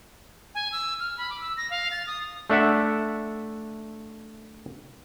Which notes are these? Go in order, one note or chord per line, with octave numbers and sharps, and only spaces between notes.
G#5
E6
F6
B5
D6
E6
A#6
F5
A6
D#6
A3 D4 E5 F#5